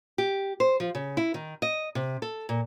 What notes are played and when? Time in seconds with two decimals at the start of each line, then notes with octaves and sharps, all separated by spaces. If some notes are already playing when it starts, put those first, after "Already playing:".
0.18 G4
0.60 C5
0.80 F3
0.95 C#3
1.17 E4
1.34 D#3
1.62 D#5
1.95 C3
2.22 A4
2.49 A#2